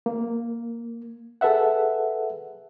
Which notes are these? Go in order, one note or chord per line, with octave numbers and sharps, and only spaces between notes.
A#3
G#4 A4 B4 E5 F#5